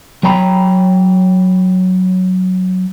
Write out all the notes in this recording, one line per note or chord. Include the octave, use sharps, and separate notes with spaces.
F#3 C#5 G5 A#5 B5